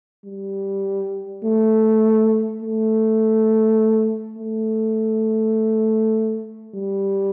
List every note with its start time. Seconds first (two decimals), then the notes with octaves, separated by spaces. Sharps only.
0.25 G3
1.44 A3
2.62 A3
4.38 A3
6.75 G3